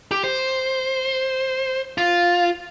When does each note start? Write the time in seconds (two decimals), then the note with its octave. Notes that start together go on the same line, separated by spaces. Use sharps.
0.11 G4
0.24 C5
1.98 F4